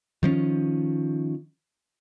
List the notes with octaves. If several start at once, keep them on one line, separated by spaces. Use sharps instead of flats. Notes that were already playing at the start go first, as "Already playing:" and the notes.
D#3 F3 B3 C#4